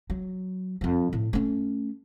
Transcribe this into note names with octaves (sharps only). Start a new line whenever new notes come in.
F#3
F2 F3
A2
A3 C#4